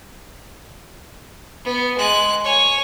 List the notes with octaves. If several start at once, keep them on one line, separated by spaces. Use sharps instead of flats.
B3
G#3 F#6
C#5 G#5